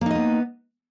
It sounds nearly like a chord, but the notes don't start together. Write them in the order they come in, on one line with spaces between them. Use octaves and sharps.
A#3 D#4 D#5 B3